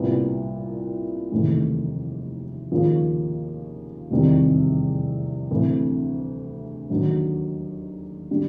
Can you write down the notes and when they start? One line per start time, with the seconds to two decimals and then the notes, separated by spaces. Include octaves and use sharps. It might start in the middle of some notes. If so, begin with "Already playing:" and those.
Already playing: C2 A#2 G3 B3
1.32 F1 D#2 C#3 E3 A3
2.72 D#2 C#3 F3 A#3
4.10 F1 E2 C3 D#3 G3
5.50 D2 C3 E3
6.90 D#2 D3 F#3
8.31 D3 G3